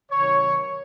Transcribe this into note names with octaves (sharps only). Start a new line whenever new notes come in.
C3 D#3 F#3 C#5